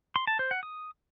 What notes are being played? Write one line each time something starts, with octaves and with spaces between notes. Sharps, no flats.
C6
A5
C5
F#5
D#6